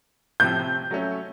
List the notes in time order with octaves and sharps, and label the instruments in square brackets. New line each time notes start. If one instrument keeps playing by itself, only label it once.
[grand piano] A2 C3 F3 [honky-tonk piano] G6
[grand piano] C3
F#3 A3 C#4